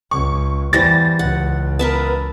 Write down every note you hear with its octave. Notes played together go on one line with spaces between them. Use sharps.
C#2 C#6
E2 E3 G3 C5 A6 A#6
C#2 C#3 F#5
B3 A#4 B4 E5 A5